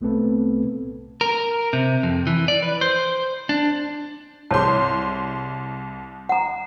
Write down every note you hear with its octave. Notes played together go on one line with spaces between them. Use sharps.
C2 A3 B3 C4 A4 B4
A#4
C3
F2
E3
D5
B4
C5
D4
C2 G#4 C#5 A5 C6
F#5 A#5